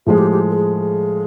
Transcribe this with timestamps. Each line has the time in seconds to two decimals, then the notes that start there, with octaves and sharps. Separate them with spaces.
0.07 A2 F3 G#3 G#4
0.18 G4
0.31 G4
0.50 A4
0.56 G#4
0.80 G#4